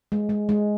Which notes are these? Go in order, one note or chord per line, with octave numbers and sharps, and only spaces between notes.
G#3
G#3
G#3